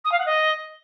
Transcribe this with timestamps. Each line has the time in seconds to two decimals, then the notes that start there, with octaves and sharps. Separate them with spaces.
0.04 D#6
0.11 F5
0.18 F#5
0.25 D#5